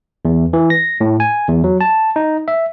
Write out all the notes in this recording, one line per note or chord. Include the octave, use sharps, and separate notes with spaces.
E2
E3
A#6
A2
G#5
E2
F#3
A5
D#4
E5